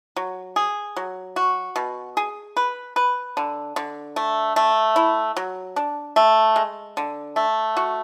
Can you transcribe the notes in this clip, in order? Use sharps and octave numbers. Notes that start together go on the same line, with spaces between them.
F#3
G#4
F#3
F#4
B2
G#4
B4
B4
D3
D3
A3
A3
E4
F#3
D4
A3
G#3
D3
A3
F#4